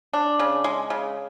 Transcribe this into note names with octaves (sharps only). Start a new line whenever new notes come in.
D4
C#3
G#3
C#3